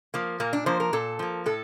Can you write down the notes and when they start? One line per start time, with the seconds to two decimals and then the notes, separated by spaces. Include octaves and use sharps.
0.14 F3 A#3
0.40 A#2 A#3
0.53 D4
0.66 F3 A#3 C5
0.80 A#4
0.93 A#2 A4
1.19 F3 A#3
1.46 A2 A4